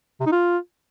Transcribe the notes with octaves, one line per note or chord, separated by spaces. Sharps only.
C3
D#4
F4